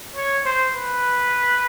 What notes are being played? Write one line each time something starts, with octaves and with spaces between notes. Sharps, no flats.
C#5
C5
B4